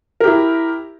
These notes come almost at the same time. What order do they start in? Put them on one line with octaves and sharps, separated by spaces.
A#4 G4 E4